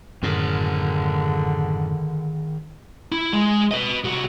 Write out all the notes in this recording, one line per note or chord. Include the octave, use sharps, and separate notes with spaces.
F#2 A2 D3 D#3 G#4 A#4
E4
G#3
B4 D#5
C2 F#4